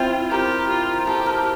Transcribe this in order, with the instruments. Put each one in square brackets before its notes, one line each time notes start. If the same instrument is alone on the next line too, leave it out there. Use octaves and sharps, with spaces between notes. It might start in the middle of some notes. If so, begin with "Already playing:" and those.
Already playing: [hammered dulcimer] C4 E4 [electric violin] F4
[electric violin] G4 [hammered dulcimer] A#4
[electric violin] F4
[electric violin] G4 [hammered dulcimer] A4
[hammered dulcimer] A#4